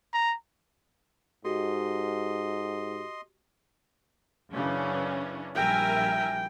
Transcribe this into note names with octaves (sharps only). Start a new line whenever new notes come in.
A#5
G#2 F#4 G4 A4 D#5 C6
F#2 C#3 E3 C#4 D4
A#1 G3 A#4 E5 G5 G#5